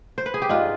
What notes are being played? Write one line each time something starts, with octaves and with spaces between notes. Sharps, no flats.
C5
B4
G#4
G4
G#2 D4 F4